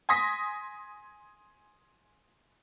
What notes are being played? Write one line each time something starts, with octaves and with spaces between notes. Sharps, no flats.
G#5 C6 D#6 A#6 B6